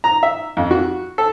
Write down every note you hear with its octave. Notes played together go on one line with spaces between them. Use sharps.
A#5
E5
F2
F#4
A4